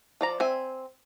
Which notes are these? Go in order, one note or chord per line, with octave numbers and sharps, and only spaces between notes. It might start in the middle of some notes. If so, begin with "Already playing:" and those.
F3 D5 A#5
C4 E5 G#5